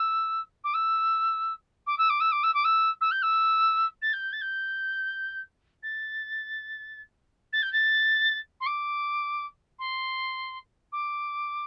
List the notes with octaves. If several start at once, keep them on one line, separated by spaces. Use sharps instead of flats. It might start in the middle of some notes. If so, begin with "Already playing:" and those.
Already playing: E6
D6
E6
D6
E6
D6
E6
D6
E6
D6
E6
E6
G6
E6
A6
G6
A6
G6
A6
A6
G6
A6
C6
D6
C6
D6